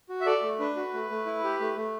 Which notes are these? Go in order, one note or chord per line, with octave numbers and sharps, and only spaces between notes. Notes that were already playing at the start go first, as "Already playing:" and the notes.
F#4
E5
A4 D5
A3
D4 B4
F#4
A3
A3
E4
G4
A3
A3